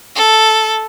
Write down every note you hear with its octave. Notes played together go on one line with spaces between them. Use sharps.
A4